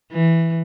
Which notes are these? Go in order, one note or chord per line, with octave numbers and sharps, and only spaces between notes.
E3